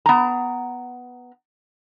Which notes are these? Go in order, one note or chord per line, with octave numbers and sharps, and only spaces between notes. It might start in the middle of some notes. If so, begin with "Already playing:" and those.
B3 A#5